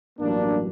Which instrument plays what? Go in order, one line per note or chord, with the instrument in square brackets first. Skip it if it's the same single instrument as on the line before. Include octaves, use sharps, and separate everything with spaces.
[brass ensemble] A1 G2 F#3 A#3 D4